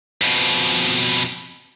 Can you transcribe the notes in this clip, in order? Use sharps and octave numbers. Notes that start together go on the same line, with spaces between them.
F2 B2